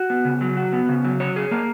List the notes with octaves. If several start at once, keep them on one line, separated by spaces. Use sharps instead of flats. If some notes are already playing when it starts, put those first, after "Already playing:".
Already playing: F#4
B3
C#3
F#3
F#4
B3
C#3
F#3
C#5
G#4
A#3